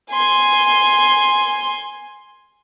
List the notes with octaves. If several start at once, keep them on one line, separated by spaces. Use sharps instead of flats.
G#5 C6